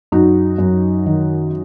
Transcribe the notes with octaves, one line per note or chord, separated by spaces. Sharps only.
F#2 D#4 F#4
F#2
D#3